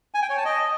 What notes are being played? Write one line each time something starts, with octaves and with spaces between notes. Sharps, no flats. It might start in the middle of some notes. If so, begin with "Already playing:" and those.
G#5
G5
C#5
A5
D#5